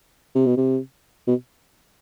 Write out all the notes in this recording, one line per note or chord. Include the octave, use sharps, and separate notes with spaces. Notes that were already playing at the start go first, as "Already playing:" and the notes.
C3
B2
C3
B2